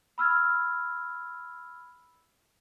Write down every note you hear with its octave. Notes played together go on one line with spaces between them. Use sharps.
B5 E6 F6 G#6